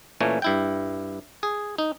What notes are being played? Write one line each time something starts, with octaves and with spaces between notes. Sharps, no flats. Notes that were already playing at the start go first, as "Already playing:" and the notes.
A#2 E3 A3 A#3 C#4
G2 E4 G5
G#4
D#4